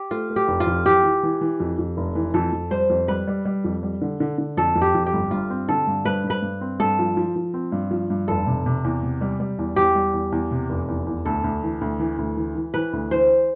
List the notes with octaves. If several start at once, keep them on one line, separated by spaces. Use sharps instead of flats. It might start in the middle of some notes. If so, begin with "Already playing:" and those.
Already playing: G4
A3 F4
A3
G4
F1
F4
F2
E3 G4
E3
E3
E3
F2
F2
F1
E3
F2 A4
F2
G3 C5
F2
G3 B4
G3
G3
F2
G3
D3
D3
D3
F2 A4
F2
G4
F2
G4
G1
G2 F4
C4
D3 A4
G2
G2 B4
G2
B4
G2
C4
G2 A4
F3
F3
F3
C4
G2
F3
G2
F1 A4
C3
C3
E2
C3
G3
G3
E2
E2 G4
G3
E2
E2
C3
F1
E2
E2
D2 A4
D2
E3
D2
E3
D2
E3
E3
E3 B4
D2
E3 C5